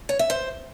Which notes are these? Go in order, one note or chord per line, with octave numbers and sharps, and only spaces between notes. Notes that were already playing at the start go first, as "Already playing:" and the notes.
C#5
E5
C5